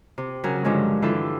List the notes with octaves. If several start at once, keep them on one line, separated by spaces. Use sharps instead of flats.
C3
C#3 F#3 C#4 A#4
G2 D3 F3 F#3 G#3
D3 E3 E4 F4 G4 A4